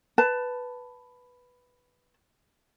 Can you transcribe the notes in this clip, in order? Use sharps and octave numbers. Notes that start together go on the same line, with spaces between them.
B4 A5